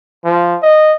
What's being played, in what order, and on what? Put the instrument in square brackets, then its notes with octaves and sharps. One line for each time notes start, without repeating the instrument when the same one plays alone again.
[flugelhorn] F3
D#5